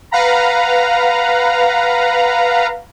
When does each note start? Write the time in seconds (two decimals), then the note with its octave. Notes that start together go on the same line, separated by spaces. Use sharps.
0.11 B4 F5 F#5 A#5 B5